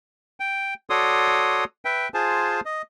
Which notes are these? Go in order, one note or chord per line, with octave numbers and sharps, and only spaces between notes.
G5
F#4 A4 C#5 D5 C6 D#6
B4 E5 G5
F4 G#4 C5 G#5 A5
D#5